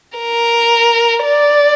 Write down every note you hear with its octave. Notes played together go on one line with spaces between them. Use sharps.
A#4
D5